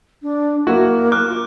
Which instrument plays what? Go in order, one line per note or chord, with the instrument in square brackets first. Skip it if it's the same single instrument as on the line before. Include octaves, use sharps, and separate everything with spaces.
[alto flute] D4
[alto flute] A#3 [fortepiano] E4 F#4
[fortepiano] D6 [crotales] F6 F#6
[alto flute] F4